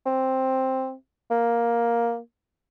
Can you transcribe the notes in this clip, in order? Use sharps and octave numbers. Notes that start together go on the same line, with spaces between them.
C4
A#3